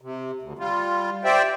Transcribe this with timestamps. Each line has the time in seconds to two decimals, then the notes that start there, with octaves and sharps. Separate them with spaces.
0.01 C3
0.42 D2
0.59 G3 F4
1.24 G4 C5 D5 E5 G5